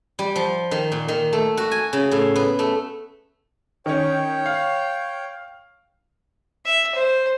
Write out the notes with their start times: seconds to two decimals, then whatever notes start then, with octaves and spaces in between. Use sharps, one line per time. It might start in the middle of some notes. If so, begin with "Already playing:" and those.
0.19 G3
0.36 F3
0.71 D#3
0.92 A#2
1.08 D#3
1.33 A3
1.57 F#4
1.71 G#5
1.93 C#3
2.11 A2
2.36 B3
2.59 A3
3.86 D#3 C#4 C#5 G5
4.46 F5
6.65 E5
6.95 C5